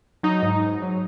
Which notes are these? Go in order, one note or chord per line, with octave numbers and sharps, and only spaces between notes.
F#3 D#4
G#2
G#2
F#3